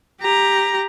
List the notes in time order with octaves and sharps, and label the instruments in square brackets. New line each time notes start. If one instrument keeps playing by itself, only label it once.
[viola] G4 A#5